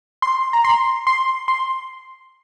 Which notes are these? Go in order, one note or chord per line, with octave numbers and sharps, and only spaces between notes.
C6
A#5
C6
C6
C6